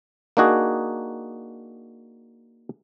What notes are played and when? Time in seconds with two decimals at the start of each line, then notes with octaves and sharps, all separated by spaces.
0.37 A#3 D4 D#4 F#4 G#4